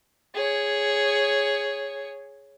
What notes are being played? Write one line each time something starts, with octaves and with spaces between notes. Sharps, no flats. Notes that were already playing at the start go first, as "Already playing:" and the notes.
G#4 C#5